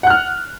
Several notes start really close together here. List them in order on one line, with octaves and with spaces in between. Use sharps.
F#5 F#6 F6